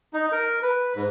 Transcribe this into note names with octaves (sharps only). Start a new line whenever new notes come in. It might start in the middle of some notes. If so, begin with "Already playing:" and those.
D#4
A#4
B4
G#2